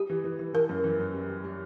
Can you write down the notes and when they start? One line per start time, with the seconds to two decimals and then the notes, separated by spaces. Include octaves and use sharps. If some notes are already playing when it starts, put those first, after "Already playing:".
Already playing: G3 G4
0.10 E3
0.24 E3
0.39 E3
0.54 E3 A#4
0.69 F#2
0.84 E3
0.99 F#2
1.13 G3
1.29 G3
1.44 G3